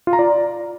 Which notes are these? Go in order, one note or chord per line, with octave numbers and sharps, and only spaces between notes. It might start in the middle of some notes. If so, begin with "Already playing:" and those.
F4
A#5
D5